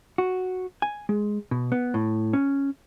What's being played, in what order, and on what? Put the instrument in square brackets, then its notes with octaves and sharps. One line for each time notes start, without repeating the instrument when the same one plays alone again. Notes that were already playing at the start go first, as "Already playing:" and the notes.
[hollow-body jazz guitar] F#4
G#5
G#3
B2
B3
A2
C#4